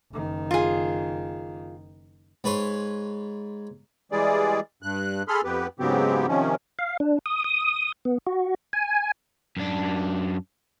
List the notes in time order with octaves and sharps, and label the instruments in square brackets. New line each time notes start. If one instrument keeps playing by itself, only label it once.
[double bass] F#1 D#3
[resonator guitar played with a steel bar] F4 G#4
[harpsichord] G#2 B4 C#5 C6
[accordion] E3 G3 G#3 G#4 D5
G2 F#6
G#4 A4 B5 C6 F6
F2 B3 G4 B4
G#2 C#3 F#3 B3 C4 G4
C3 D#3 F3 C#4
[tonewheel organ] F5
D4
D#6
D#6
B3
F#4
G#5
[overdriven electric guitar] F#2 D4